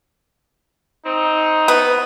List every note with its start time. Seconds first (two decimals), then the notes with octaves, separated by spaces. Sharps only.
1.06 C4 D#4
1.68 B3